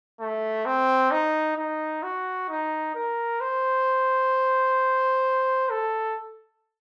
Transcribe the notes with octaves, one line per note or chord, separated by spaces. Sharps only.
A3
C4
D#4
D#4
F#4
D#4
A#4
C5
A4